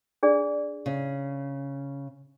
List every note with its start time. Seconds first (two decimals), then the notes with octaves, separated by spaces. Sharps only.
0.23 D4 G#4 D5
0.86 C#3